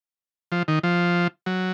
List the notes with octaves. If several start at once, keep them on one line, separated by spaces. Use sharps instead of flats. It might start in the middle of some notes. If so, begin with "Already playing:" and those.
F3
D#3
F3
F#3